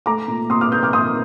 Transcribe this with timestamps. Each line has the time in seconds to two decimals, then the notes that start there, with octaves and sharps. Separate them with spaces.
0.06 A3 A#5 D6
0.28 A#2
0.50 A#2 C6 D#6
0.61 D6 F6
0.71 A#2 D#6 G6
0.83 D6 F6
0.93 A#2 C6 D#6